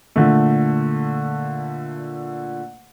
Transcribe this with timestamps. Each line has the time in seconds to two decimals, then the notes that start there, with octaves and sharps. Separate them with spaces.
0.16 A#2 D3 A3